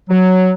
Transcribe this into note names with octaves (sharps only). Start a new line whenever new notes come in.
F#3